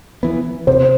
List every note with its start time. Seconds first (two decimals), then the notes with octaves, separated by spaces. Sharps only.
0.23 E3 B3
0.67 C3 C5